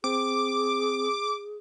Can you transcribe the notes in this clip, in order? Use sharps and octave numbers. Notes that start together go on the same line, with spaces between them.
C4 G#4 D6